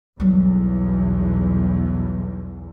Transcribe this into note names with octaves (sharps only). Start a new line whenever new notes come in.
B1 E2 F#3 G3